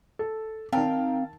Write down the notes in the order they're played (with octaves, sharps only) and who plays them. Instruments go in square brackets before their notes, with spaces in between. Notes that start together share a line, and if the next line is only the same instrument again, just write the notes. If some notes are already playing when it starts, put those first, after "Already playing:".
[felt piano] A4
[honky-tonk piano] D#3 A#4 G5 [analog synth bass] C4 [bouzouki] F5 [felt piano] A5